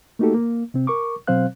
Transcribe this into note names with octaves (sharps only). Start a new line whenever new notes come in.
A3 A#3 D#4 F#4 G4 A4
A#3
C3 C4
A#4 C#6 D6
B2 F#3 C4 C5 F5 F#6